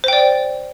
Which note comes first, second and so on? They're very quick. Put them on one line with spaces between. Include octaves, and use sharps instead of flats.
C5 G5 D5